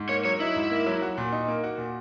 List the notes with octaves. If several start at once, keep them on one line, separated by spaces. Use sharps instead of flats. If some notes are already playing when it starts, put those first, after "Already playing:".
Already playing: G#2
A#3 C#5
F#3 C#5
D#4 E4
G#2
A#3
F#3
F#4
A#2
D#4
A#3
F#4
A#2